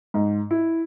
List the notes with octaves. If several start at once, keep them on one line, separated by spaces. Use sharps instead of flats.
G#2
E4